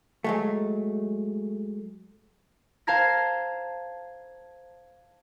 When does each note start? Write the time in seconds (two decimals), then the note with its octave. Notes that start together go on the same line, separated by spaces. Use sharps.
0.24 F#3 G#3 A3
2.87 C5 F5 A5 A#5 G#6 A#6